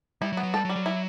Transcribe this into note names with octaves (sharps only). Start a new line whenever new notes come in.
G3 E4
F#3
B3
F#3
G3 A4
F#3
G3
F#3
E4